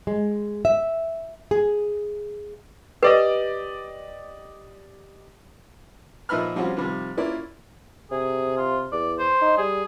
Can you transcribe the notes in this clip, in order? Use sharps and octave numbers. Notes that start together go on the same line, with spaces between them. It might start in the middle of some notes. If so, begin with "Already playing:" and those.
G#3
E5
G#4
G4 B4 D5 D#5
A#2 F3 D#4 E5 B5 F6
F3 G3 C4 C#4 F#4
C3 D#3 F3 G3
A#3 C#4 E4 F4 A#4 D5
C3 G#4
F4
E2 D5
C5
D#4
G3 G#4